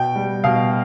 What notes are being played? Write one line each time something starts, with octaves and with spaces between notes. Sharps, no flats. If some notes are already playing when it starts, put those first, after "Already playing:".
Already playing: B2 G5
G3
B2 F5